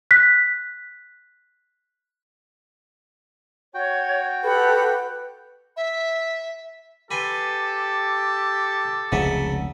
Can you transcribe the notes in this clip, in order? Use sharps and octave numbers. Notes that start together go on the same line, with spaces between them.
F#6 B6
F#4 C#5 G5
G4 A4 B4 F#5 B5
E5
G4 A4 B4 G#5 C6
F1 C#2 C#3 F#3 E5